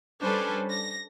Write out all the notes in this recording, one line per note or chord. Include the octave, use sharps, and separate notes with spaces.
G3 C#4 D4 A4 B4 C5
A#6